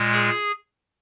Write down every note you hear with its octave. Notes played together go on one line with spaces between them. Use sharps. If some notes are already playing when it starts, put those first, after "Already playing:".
Already playing: A#2 G#3
G#4